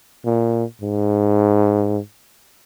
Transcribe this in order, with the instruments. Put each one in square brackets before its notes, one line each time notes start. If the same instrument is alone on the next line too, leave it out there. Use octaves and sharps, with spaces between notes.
[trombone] A#2
G#2